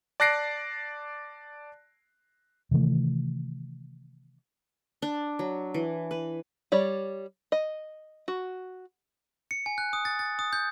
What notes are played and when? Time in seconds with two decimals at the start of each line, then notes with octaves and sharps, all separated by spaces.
0.20 D5 A5 F#6 A#6 C7 D7
2.71 C3 D#3 E3 A3
5.02 D4
5.39 F#3
5.74 E3
6.11 B4
6.72 G3 C#5 D5
7.52 D#5
8.28 F#4
9.51 C#7
9.66 G#5
9.78 F#6
9.93 D#6
10.05 A6
10.19 A6
10.39 D#6
10.53 G6